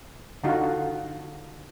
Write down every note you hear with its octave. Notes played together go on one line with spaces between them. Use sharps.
D3 D#4 F4 F#4